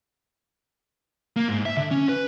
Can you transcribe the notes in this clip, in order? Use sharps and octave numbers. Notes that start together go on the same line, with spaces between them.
A#3
G#2
E5
D3
C#4
B4